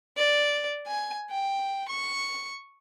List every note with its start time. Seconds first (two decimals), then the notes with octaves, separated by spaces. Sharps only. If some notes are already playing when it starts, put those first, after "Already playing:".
0.17 D5
0.87 G#5
1.31 G5
1.89 C#6